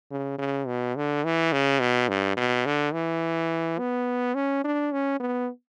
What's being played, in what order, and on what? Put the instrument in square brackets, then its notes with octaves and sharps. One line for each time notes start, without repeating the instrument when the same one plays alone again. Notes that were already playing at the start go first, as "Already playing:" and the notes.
[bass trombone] C#3
C#3
B2
D3
E3
C#3
B2
G2
B2
D3
E3
B3
C#4
D4
C#4
B3